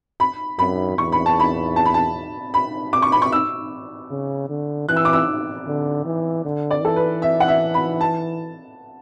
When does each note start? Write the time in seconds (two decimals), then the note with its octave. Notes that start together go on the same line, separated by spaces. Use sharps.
0.20 B5
0.59 F#2 B5
0.97 E2 C#6
1.12 B5
1.26 A5
1.40 B5
1.76 A5
1.85 B5
1.94 A5
2.54 B5
2.93 D6
3.02 C#6
3.12 B5
3.22 C#6
3.32 E6
4.11 C#3
4.50 D3
4.89 E3 F#6
4.96 E6
5.05 D6
5.13 E6
5.67 D3
6.05 E3
6.45 D3
6.71 D5
6.83 E3 A4
6.96 B4
7.22 E5
7.40 F#5
7.48 E5
7.74 B5
8.01 A5